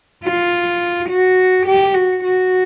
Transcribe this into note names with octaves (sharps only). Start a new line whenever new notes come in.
F4
F#4
G4
F#4
F#4